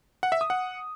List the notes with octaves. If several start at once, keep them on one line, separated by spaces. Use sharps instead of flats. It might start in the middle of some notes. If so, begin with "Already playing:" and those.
F#5
E5
D#6
F#5